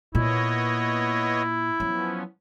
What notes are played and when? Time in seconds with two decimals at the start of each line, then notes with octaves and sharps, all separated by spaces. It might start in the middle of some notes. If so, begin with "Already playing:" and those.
0.15 A#2 B3 E4 C#5 D#5
1.80 F3 F#3 B3 C#4